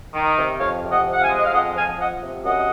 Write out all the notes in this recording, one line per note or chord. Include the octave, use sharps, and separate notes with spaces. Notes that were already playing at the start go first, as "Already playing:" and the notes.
D#3
C3
F2 C#5 F5
C3
D#5 F#5
F3
F#5
F5 G#5
G#3
D#5
F5
F2 D#5 F#5
F3 F5 G#5
F3 D#5 F#5
C3
F#2 D#5 F#5